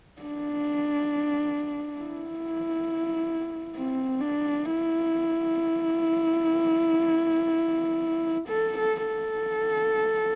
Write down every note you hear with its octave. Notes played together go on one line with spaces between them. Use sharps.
D4
E4
C4
D4
E4
A4
A4
A4